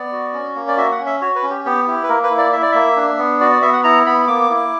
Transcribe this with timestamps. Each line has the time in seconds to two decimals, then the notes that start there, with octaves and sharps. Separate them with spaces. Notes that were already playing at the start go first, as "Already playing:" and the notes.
Already playing: B3 D5
0.12 F#4
0.33 C#4
0.55 A#3
0.68 D5
0.77 F#4 E5
0.92 F#5
1.00 C#4
1.06 E5
1.21 F#4 C#5
1.36 B4
1.43 C#4
1.50 G4
1.65 B3 G4
1.87 E4 G4
2.03 B4
2.09 A#3 A#4
2.23 B4
2.31 E4
2.38 D5
2.53 E4 E5
2.62 D5
2.72 A#3 E5
2.97 D4
3.18 B3
3.40 F#4 D5
3.51 D5
3.62 B3 E5
3.73 F#5
3.84 E4 A#5
4.06 B3 B5
4.28 A#3 D6
4.50 E4